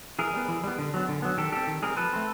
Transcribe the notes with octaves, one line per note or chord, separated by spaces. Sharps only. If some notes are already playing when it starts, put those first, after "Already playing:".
E3 G#4 A#4
G3 B3
E3
G3 B3
D3
F#3 B3
D3
F#3 B3
D#3 G4 A4
G3 C4 G4 A4
D#3
G3 C4 G#4 A#4
F3 A4 B4
A3 C4